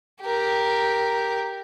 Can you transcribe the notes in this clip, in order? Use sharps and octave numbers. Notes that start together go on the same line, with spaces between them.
G4 A#4